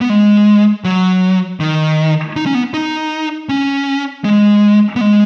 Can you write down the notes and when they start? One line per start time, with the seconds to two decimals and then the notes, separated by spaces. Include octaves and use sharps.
0.01 B3
0.10 G#3
0.84 F#3
1.60 D#3
2.36 D#4
2.46 C#4
2.55 B3
2.74 D#4
3.49 C#4
4.24 G#3
4.96 B3
5.01 G#3